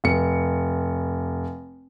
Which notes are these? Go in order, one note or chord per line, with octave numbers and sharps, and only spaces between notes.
F1 C#7